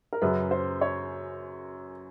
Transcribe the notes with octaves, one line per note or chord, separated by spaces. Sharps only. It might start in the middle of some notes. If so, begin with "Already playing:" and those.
A#4
F#2 C#3 F#3 B4
C5
C#5